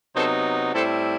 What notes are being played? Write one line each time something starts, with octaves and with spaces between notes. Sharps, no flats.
C3 F#3 B3 D#4 A4 C5
A2 G3 C4 E4 A4 C5